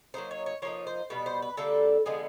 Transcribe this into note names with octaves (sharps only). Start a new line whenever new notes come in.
F#3 A#3 D#4 C5
C#5
C#5
F3 A#3 D#4 C#5
C5
B2 G3 B3 B4
C5
B4
D3 G3 A#3 D4 A4
D3 F3 G#3 B3 G#4